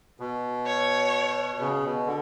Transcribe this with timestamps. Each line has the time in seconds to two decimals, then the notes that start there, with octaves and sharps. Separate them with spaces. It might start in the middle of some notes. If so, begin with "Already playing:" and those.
0.20 B2
0.66 C#5
1.60 C#3
1.84 B2
2.07 D3